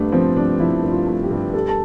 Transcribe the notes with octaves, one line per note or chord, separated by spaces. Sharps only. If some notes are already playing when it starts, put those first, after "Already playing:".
Already playing: G2 A3 B3 D4
F3 C4
G2 D4
F3 E4
G2
F4
A3
G4
G2
G3 A4
A5